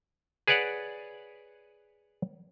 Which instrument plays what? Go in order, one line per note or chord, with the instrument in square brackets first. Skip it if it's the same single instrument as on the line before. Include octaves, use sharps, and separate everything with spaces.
[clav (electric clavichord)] G#4 B4 C#5 D5 F#5